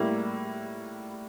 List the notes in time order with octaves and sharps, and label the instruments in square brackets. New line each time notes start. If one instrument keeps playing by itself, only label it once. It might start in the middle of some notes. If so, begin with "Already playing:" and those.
Already playing: [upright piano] A2 G3 A#3 E4